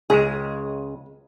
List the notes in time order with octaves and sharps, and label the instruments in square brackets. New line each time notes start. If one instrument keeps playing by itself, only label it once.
[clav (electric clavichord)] C#2 C#3 G#3 [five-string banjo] G#4